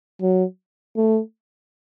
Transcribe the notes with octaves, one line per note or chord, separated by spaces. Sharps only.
F#3
A3